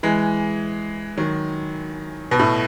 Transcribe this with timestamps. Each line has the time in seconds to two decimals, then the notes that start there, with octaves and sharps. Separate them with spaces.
0.03 E3 G#3
1.18 D#3 F#3
2.31 B2
2.39 A2